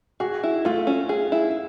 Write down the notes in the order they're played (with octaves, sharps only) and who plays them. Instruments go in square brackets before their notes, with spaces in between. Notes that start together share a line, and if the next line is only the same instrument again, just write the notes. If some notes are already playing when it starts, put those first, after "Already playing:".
[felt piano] F#4 [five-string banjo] G#4
[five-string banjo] E4
[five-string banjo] A3 [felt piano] F4
[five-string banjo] C#4
G#4
E4